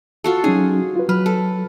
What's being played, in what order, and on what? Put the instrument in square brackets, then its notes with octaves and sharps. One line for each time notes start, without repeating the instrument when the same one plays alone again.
[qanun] F4 F#4 A4
[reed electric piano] F#3 C#4 D#4 [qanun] G#4
[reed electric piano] F4 B4
[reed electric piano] F#3 F6 [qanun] B4
[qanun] A4